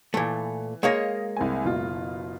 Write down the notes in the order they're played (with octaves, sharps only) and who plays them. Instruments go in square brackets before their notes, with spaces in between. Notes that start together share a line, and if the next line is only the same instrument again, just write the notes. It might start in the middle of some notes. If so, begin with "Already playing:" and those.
[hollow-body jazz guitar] A#2 A3 [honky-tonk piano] E3
[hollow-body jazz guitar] G#3 A#3 C#5 [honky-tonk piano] D#5 F5 A#6
[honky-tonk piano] C2 C4 G#5
F#1 B2 F4